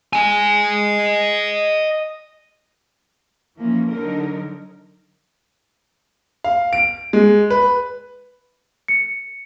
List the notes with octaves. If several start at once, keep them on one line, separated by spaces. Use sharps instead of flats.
D#5 G#5
E3 F3 A#3 C#4
D3 F#3 D#4 A#4
F5
D7
G#3
B4
C#7